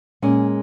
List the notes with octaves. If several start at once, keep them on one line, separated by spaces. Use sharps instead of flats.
A#2 G#3 C#4 G#5